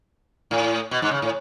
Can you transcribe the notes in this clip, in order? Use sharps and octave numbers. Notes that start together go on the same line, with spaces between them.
A2
B2
G#2
C#3
A2